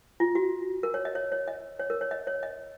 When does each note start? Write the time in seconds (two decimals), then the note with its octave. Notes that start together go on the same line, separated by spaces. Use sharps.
0.20 F4
0.35 F#4
0.83 A#4
0.94 C#5
1.05 D#5
1.15 C#5
1.32 C#5
1.48 D#5
1.79 C#5
1.90 A#4
2.01 C#5
2.11 D#5
2.27 C#5
2.43 D#5